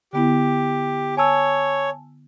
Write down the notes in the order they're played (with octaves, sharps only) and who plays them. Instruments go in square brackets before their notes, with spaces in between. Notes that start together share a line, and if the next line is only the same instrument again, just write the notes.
[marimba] D3 B3 E4 [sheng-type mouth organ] G4
[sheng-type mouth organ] C#5 [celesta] G#5 A5 E6